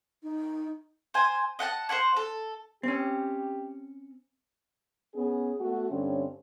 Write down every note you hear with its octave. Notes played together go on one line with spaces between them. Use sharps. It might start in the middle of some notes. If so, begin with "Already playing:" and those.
D#4
C5 G#5
D#5 F#5 G5 A5
C5 C#5 F#5 C#6
A4
C4 C#4 G4
B3 C#4 G#4
A3 B3 F#4
G2 D3 C4 C#4 C#5